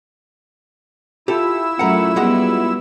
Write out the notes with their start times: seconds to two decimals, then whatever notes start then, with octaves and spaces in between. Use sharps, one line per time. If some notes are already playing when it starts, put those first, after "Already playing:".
1.28 E4 F4 G4 A4 E6
1.79 F#2 A3 F#4 A#4 F#5
2.16 G3 G#3 B3 F#4 F#5